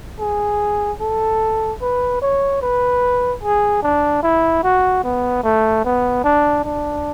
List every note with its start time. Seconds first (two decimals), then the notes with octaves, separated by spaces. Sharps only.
0.20 G#4
1.00 A4
1.81 B4
2.22 C#5
2.62 B4
3.43 G#4
3.82 D4
4.23 E4
4.63 F#4
5.03 B3
5.43 A3
5.84 B3
6.24 D4
6.64 D4